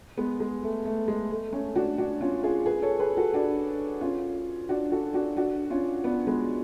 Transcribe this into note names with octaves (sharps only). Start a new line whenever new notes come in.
G#3 B3
G#3
A3
A3
G#3
A3
A3 C#4
D4 F#4
D4 F#4
C#4 F4
F4 G#4
G#4 B4
A4 C#5
G#4 B4
F#4 A4
D4 F#4
C#4 F4
D4 F#4
F#4 A4
D4 F#4
D4 F#4
C#4 F4
B3 D4
G#3 B3